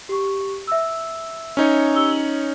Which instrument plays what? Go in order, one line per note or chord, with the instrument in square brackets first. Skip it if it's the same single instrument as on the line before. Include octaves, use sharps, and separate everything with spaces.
[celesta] G4 C#6
E5 E6
[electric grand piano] C#4 D#4 C#5
[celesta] G4 E6 G7
F#7